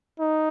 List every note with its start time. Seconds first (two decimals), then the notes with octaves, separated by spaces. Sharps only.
0.19 D#4